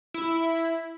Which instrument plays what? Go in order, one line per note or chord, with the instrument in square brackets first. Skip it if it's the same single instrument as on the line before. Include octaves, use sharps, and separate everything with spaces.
[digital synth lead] E4